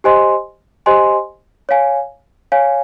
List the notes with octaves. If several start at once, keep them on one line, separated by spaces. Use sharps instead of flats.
G4 C5 D#5 G#5 C6
G4 C5 D#5 G#5 C6
C#5 F5 G#5
C#5 F5 G#5